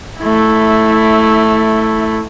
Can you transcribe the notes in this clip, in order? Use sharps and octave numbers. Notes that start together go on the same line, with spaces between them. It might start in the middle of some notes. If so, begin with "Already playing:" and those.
A3 E4